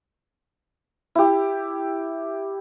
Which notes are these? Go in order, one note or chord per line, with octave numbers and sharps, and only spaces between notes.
E4 G4